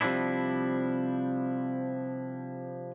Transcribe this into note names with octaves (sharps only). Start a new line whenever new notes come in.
C3 F3 G3 C4 D4 E4